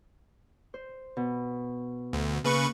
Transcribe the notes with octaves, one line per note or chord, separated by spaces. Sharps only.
C5
B2
D2
C#3 A#3 B4 C#6